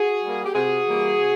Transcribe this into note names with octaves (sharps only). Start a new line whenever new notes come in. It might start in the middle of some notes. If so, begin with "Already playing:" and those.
Already playing: F#4 G#4
G3 A#3
G4
C3 F#4 G#4
E3 G3 A#3
C3